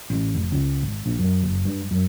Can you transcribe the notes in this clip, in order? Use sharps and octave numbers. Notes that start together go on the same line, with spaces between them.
A1
F1
C#2
G#1
A#1
F#2
F#1
G2
F#2